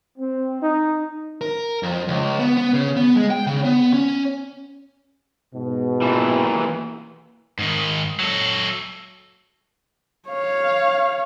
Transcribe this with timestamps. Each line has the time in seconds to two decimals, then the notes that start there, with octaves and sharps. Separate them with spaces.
0.19 C4
0.63 D#4
1.41 A#4
1.83 F2
2.08 C#2
2.40 B3
2.57 B3
2.74 C#3
2.97 B3
3.17 G#3
3.31 G5
3.47 C#3
3.65 B3
3.93 C#4
5.54 G#2 B2
6.02 A#2 E3
7.59 G#2 D#3
8.20 F#3 A4
10.29 C#5 F5